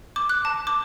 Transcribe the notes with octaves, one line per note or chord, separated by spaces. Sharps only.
D6
F#6
A5
D6